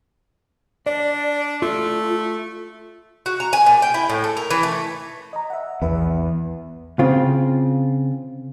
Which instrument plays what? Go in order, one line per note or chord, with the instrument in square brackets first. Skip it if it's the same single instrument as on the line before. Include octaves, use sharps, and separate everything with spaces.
[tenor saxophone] D4 [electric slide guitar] D5
[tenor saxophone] A3 [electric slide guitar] F4
[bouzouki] F#4
A#5
G#5
A#2
G5
E4
A2
A4
A#4
E3
A3
[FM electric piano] D#5 A#5
E5 F#5
[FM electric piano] A#1 B4 E5 [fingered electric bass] E2
[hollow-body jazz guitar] C#3 C4 F4